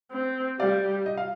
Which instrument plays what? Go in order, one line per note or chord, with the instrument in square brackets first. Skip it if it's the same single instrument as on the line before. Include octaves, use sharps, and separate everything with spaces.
[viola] C4
[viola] G3 [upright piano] D5 F5
[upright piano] D#5
F5